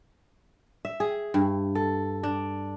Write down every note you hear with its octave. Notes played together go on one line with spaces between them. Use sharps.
E5
G#4
G2
A4
D4